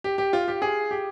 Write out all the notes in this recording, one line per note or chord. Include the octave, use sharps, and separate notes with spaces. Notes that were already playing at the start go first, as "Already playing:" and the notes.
G4
G4
F4
G4
G#4
G4